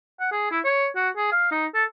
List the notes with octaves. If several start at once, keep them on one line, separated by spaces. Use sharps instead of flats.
F#5
G#4
E4
C#5
F#4
G#4
F5
D#4
A4